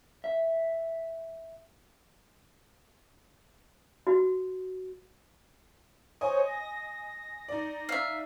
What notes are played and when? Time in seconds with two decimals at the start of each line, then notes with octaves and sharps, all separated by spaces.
0.24 E5
4.07 F#4
6.21 C5 C#5 D#5 G#5
6.46 A#6
7.48 D#4 D5
7.89 E5 F5